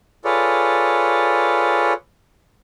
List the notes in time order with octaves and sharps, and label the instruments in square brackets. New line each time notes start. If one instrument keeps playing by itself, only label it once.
[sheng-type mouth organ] F4 G#4 A4 B4 C#5 D5